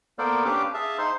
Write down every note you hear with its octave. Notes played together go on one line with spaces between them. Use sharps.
A#3 B3 A4 A#4 C5 D5
C#4 D4 G4 B4 F5 D6
G#4 E5 F5 A5
D#4 C5 C6